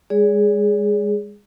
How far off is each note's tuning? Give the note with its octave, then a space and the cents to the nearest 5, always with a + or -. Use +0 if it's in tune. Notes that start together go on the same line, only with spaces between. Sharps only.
G#3 -30 G#4 +0 D5 -45